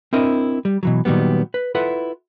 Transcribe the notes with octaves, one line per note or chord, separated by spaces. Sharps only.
C4 D4 E4 A#4 D#5
G3
B2 E3 F#3
A#2 D#3 F#3 G3 B3
B4
E4 F4 A4 B4 F#5